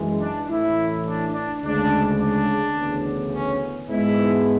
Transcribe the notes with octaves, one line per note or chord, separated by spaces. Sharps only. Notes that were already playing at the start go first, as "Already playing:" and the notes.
Already playing: F#2 E3 G#3
D4
A1 A2 E3 A3 E4
D4
D4
D2 C#3 G#3 D4
D4
D2 C#3 E3 B3
C#4
G#2 G#3 B3 E4